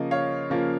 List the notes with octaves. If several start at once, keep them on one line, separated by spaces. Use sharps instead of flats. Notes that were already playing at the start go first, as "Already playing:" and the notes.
Already playing: C#3 F3 A#3 D#5
C#5 F5
C#3 F3 A#3